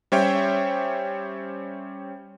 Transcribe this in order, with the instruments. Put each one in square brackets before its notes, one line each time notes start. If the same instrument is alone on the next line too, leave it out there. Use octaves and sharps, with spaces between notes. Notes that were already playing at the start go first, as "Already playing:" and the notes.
[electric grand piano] G3 C#4 C5 C#5 E5 G5